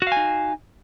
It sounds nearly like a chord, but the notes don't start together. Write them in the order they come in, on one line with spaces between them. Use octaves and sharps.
F#4 F5 G#5 D#4